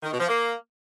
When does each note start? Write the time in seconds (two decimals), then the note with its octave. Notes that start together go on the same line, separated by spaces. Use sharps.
0.02 D#3
0.11 B2
0.19 F3
0.28 A#3